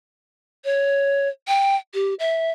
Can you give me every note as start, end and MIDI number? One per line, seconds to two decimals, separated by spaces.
0.65 1.29 73
1.48 1.76 79
1.94 2.14 67
2.19 2.51 76